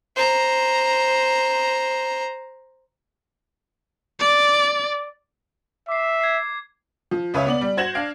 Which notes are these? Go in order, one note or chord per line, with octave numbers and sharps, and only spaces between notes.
C5 A#5
D5
E5 D6 C7
G#6 C7
F3
C#2 C#3 B4 C#5 E5
B3 D5 F#7
G3
F#4 C5 G#6 A#6 E7 F#7
D4 F5 D7